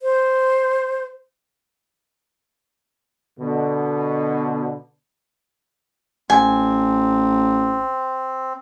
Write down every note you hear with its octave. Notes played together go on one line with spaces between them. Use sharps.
C5
B2 D3
A1 C4 G#5